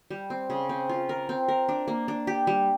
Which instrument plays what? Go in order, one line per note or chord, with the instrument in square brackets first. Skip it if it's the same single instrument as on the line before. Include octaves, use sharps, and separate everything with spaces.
[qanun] G3
C4
C#3
C4
F4
A#4
C4
A#4
D4
A#3
D4
G4
G3